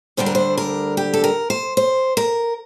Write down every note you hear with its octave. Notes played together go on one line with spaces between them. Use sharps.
D2 D3 G3 D4 C5
A#4
C5
A#4
G4
A4
A#4
C5
C5
A#4